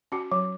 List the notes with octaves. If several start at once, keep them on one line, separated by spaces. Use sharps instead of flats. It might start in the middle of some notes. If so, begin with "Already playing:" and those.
C#4 F#4
F#3